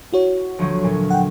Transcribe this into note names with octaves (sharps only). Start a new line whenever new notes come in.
E4 F#4 C#5
D2 F3 F#3
A#2 F#3
F#5 G5